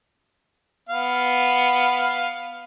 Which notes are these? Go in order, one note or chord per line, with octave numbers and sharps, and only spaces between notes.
B3 F5